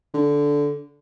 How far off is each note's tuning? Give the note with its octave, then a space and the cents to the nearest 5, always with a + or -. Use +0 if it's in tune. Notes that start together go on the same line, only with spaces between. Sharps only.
D3 -15